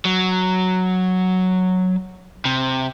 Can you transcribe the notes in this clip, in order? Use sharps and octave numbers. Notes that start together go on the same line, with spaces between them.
F#3
C3